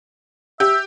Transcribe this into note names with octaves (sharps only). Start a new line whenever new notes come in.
G4 E5